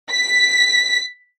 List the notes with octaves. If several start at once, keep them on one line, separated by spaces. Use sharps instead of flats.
B6